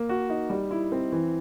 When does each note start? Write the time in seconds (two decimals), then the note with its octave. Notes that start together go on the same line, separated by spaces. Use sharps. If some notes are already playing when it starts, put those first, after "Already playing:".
Already playing: A#3
0.09 F#4
0.30 D#4
0.50 G3
0.71 E4
0.92 C4
1.12 E3